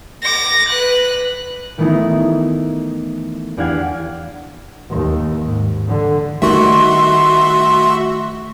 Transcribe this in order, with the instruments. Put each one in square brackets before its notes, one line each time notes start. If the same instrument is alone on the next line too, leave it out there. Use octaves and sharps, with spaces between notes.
[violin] D6 A#6
B4 F#6
[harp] D#3 E3 A3 B3 D#4 E4
E2 D4 G4 F5 F#5 G#6
[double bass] D#2
G#2
D3
[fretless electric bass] D#3 G3 [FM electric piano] A3 C#6 [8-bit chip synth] F#4 E5 [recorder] C6